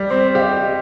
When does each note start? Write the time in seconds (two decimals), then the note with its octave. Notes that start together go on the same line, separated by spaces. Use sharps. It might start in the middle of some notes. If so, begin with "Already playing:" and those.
Already playing: G3
0.10 C4 C5
0.35 G4 F5
0.40 D#5